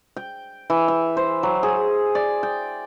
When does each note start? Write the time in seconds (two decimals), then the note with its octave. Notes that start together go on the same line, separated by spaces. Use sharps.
0.16 G5
0.70 E3
0.88 E5
1.17 C5
1.43 F#3
1.63 G#4
2.15 D5
2.43 G5